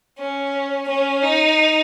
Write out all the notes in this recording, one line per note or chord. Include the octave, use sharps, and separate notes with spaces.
C#4
C#4
D#4